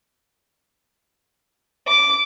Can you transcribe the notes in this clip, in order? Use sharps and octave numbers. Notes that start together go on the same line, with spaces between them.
D6